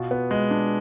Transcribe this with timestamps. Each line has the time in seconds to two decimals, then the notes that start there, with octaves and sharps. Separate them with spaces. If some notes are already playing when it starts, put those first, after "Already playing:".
Already playing: B2 F4
0.11 B3
0.31 G#3
0.51 D4